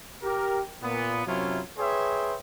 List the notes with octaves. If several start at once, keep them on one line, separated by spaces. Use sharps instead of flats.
G4 A#4
A#2 B3
F#2 C3 F#3 C#4 E4 F4
G#4 B4 C#5 E5 G5 C6